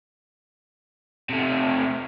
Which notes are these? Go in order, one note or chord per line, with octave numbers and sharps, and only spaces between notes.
C3 A3